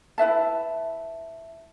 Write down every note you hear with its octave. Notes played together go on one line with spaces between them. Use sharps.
E4 B4 E5 A5